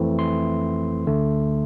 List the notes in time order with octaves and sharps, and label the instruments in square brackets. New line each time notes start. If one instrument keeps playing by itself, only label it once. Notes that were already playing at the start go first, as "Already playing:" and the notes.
Already playing: [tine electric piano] F2 E3 A3 C4 E4
C6
D2 D3 A3